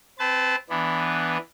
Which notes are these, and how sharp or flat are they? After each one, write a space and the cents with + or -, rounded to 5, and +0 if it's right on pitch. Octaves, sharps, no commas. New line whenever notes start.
C4 +0 B4 +30 A5 -15
E3 +0 B3 +0 D4 +0